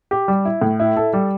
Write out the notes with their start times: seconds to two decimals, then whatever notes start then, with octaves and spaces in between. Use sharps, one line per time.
0.11 G4
0.28 G3
0.45 E4
0.62 A2
0.80 E4
0.97 A4
1.13 G3